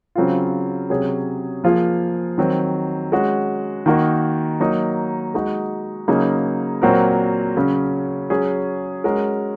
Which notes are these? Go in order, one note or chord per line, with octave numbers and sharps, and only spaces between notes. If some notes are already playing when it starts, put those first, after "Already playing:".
C#3 F#3 C4 F4
C3 F#3 C#4 G#4
F3 A#3 F4 G#4
D#3 F#3 C4
G#3 C#4 F#4
D#3 A#3 D#4 F#4 A#4
F#3 A#3 D#4 A#4
G#3 D#4 F#4
C#3 F#3 A#3 D#4 G#4
A#2 F#3 C4 F#4 A#4
C#3 F#3 C#4
F#3 C#4 G#4
G#3 C#4 F#4 A#4